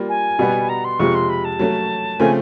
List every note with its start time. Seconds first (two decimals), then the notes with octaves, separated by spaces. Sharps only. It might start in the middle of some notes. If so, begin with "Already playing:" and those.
Already playing: G3 A#3 F4
0.08 G#5
0.39 B2 G3 B3
0.69 A#5
0.84 C6
0.99 F2 C3 F3 G#3 C#6
1.14 C6
1.29 B5
1.44 A5
1.59 F#3 A3 C#4
2.19 C#3 F3 A3 C4 G#5